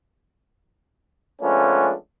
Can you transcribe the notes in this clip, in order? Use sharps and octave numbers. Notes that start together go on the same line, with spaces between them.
F3 G#3 A3 B3 C#4 D4